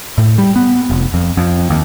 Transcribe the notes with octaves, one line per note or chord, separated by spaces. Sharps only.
A2
G3
B3
F1
F2
F2
D#2